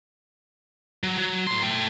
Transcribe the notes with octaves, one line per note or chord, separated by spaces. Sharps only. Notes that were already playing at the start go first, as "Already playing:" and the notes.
F#3
F#3
A2 C6
A3 G5